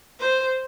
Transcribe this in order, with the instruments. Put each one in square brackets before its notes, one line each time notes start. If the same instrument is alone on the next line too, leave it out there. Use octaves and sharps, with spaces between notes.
[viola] C5